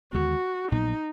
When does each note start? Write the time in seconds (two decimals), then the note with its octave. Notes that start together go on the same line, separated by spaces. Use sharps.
0.13 D#2 D3 G#3 B3 F#4
0.71 A#1 A#2 F#3 B3 D#4